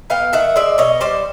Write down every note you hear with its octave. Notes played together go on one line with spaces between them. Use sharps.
B3 F5 G5
D#3 E5 F#5
G#3 D5 E5
B2 C#5 D#5
G3 C5 D5